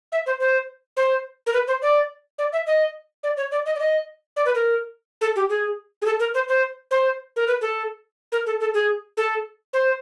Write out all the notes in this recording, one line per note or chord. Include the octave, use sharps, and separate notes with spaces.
E5
C5
C5
C5
A#4
B4
C5
D5
D5
E5
D#5
D5
C#5
D5
D#5
D5
D#5
D5
B4
A#4
A4
G4
G#4
G#4
A4
A#4
C5
C5
C5
A#4
B4
A4
A#4
A4
A4
G#4
A4
C5